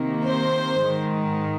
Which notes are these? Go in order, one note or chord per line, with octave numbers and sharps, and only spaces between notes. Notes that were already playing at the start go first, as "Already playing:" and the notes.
Already playing: C3 D#3 A#3
C5
G#2 D#3 G#3